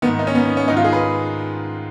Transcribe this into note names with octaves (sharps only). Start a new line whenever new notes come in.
G#2 D#3 B3
D#4
C#4
B3
B3
C#4
G#2 D#3 D#4
F4
G#4
B4